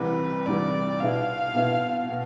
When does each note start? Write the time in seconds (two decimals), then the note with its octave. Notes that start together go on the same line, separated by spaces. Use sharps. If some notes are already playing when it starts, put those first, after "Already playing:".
Already playing: C2 C3 E3 G3 B4
0.46 C2 C3 E3 G3 D5
1.00 B2 B3 E4 F5
1.54 B2 B3 E4
2.09 B2